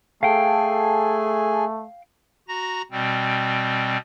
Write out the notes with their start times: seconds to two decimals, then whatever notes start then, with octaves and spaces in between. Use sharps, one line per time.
0.23 A3 G#4 A4 F5 G5 G#5
2.48 F#4 A#5 A#6
2.92 B2 G3 C4